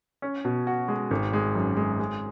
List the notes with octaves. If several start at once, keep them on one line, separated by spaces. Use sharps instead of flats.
C#4
B2
F#4
G#3
G#1
G#3
F#2
G#3
G#3